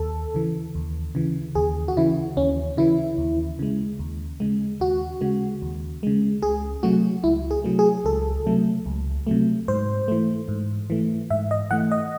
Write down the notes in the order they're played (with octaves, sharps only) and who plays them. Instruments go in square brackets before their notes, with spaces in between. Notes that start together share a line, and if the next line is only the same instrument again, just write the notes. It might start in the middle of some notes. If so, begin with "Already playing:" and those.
Already playing: [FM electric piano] D#2 A4
C#3 E3
D#2
C#3 E3
D#2 G#4
F#4
C#3 E3 E4
D#2 C#4
C#3 E3 E4
D#2
C#3 G#3
D#2
C#3 G#3
D#2 F#4
C#3 G#3
D#2
C#3 G#3
C#2 G#4
C3 F#3 A3 F#4
C#2 E4
G#4
C3 F#3 A3
G#4
C#2 A4
C3 F#3 A3
C#2
C3 F#3 A3
G#2 C5
E3 A3
G#2
E3 A3
G#2 E5
D#5
E3 A3 F#5
D#5